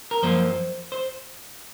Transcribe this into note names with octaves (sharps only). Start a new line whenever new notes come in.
A#4
F#2 F3 A#3 C5
C5